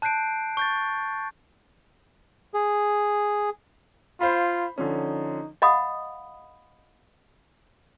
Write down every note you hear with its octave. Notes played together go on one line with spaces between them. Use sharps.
A5 F#6 G6 C7 D7
C#6 G6 A6
G#4
F4 C5 F5 B5
D3 F3 C#4 D#4
D#5 F5 F#5 B5 D#6